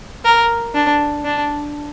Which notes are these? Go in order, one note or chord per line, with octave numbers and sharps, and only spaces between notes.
A#4
D4
D4